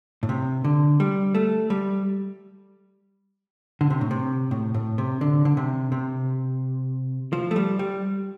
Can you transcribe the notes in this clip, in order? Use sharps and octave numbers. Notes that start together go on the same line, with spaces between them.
A2
C3
D3
G3
A3
G3
D3
C3
A2
C3
A2
A2
C3
D3
D3
C3
C3
F3
A3
G3
G3